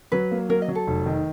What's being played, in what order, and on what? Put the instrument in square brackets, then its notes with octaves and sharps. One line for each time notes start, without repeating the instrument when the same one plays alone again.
[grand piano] F#3 [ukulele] B4
[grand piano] A#3
[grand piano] F#3 [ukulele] A#4
[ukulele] D#5
[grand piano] F#3
[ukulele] A4
[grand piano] F1
D#3